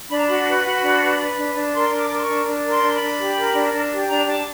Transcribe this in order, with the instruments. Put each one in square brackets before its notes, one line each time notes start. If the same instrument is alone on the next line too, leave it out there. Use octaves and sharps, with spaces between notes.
[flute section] D4 B5
A#5
F#4 B5
B4
F#4
D4
B4
B4
D4
D4
A#4 C6
D4
D6
A#4
C6
C#6
D4
D4
A#4
C6
D4
B5
D4
G4
A#4
D4
D4
G4
D4 A#5
D4 A5